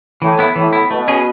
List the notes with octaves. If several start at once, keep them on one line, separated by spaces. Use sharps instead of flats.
A2 E3
B3 E4
A2 E3
B3 E4
B2 A3
C#4 G#4 D#5